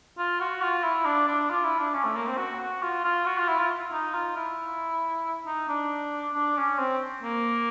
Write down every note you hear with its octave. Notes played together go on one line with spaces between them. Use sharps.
F4
F#4
F4
E4
D4
D4
F4
E4
D4
C#4
A3
A#3
C4
F#4
F#4
F4
F4
F#4
F4
E4
F4
D#4
F4
E4
D#4
D4
D4
C#4
C4
A#3